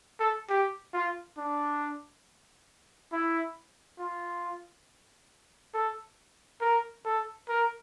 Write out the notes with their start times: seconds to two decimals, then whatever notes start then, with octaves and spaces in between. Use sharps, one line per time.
0.20 A4
0.49 G4
0.93 F4
1.37 D4
3.12 E4
3.99 F4
5.74 A4
6.61 A#4
7.05 A4
7.48 A#4